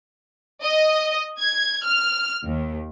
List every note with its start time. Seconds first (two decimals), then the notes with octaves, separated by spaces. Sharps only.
0.62 D#5
1.39 G#6
1.84 F6
2.45 D#2